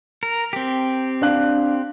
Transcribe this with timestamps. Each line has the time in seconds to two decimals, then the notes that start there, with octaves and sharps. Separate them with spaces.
0.23 A#4
0.53 C4 G4
1.22 D4 F5 F#6